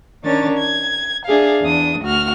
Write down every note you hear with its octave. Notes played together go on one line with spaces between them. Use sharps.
D#3 C#4 D4 C#5 A6
G#6
D4 G#4 E5 F5
E2 D4 D#6
D2 F#4 F6